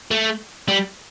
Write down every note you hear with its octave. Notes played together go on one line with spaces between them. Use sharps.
A3
G3